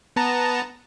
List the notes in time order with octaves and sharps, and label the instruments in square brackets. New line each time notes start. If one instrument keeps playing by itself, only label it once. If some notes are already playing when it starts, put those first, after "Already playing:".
[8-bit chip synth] B3 A5 A#5